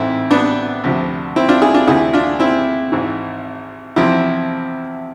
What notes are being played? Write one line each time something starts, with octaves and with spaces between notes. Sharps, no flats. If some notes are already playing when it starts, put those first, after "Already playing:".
Already playing: A1 G#2 E3 C4 E4
B3 D4
D2 C3 F3
C4 E4
D4 F4
E4 G#4
D4 F4
D2 C3 E3 E4 G#4
D4 F4
C4 E4
G#1 G#2 E3
E2 C3 F3 C4 E4